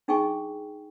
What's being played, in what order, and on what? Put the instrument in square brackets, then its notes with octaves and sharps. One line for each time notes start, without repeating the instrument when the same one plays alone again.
[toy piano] D4 D#4 G#4 G5 G#5 C#6